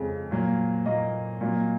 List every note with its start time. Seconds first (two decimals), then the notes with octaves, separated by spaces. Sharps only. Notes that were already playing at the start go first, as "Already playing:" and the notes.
Already playing: F2 C#3 G#3
0.31 A#2 F#3 A#3
0.86 A#2 F#3 A#3 D#5
1.41 A#2 F#3 A#3